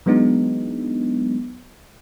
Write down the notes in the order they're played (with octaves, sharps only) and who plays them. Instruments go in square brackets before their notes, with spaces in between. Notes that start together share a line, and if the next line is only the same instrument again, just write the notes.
[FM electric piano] E3 F#3 G#3 B3 D4 D#4